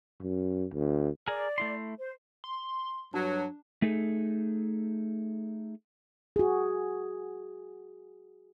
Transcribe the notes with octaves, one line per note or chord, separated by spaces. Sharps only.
F#2
D2
G#4 A#4 D5
A3 E4 C6
C5
C6
G2 F#3 D4
A3 D#4 G#4 A4
F#4 G#4